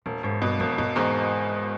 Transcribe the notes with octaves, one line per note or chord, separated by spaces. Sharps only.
E1 A#2
E1 G#2
G2 B2
E1 F2
G2 B2
E2 G#2